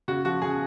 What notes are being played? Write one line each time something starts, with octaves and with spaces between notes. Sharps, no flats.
C#3 F#4
F3 F#4
C#3 G#4